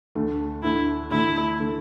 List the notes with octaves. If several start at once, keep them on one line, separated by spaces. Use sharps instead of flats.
D2 D3 A3
D2 D3 A3 E4
D2 D3 A3 E4
D3 A3